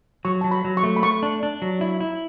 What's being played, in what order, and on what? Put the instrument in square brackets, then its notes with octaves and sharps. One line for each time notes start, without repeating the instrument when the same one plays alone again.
[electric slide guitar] F#3 [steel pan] C#6
[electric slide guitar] F#3 [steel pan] A5
[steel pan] B5
[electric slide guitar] F#3
[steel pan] C#6
[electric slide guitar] A3
[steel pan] B5
[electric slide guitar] A3 [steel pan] C#6
[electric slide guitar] D4
D4
F#3
E4
E4